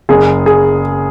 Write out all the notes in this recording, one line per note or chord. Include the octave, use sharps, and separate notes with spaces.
F#1 G#4
G#4